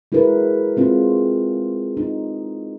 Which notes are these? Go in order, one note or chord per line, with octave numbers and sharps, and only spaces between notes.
G#3 E4 F#4 A#4 B4
G#3 C4 F4
D#4